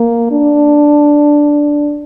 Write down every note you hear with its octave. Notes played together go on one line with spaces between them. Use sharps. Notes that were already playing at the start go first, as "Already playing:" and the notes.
Already playing: A#3
D4